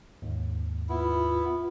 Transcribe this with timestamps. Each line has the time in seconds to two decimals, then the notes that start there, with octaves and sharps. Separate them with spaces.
0.22 D#2 G#2
0.89 B3 E4 F4